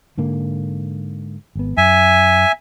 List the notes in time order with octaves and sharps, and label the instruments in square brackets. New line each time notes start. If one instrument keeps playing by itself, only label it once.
[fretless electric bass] G#2 D3 A#3
G#1 B3
[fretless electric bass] F#2 [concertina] E5 G#5